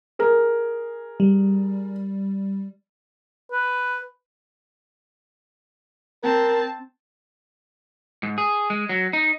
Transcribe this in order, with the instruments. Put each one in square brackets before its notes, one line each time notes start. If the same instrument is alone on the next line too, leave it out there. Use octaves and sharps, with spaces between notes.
[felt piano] G#4 A#4
[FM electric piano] G3
[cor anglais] B4
[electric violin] C4 A5 [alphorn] A#4
[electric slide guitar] G#2
G#4
G#3
F#3
D#4